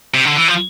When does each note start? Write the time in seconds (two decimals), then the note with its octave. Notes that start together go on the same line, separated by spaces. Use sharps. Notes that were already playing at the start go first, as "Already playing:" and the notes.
0.14 C3
0.25 D3
0.37 E3
0.48 F3